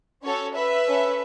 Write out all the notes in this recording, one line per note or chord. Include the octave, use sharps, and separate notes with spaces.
C#4 F#4 A4 C#5
B4 E5
C#4 A4